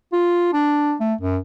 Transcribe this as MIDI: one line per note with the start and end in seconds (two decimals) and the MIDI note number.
0.13 0.52 65
0.53 0.94 62
1.00 1.14 57
1.21 1.37 42